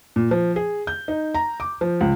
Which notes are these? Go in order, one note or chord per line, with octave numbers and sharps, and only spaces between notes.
A#2
F3
G#4
G6
D#4
A#5
D6
F3
C#2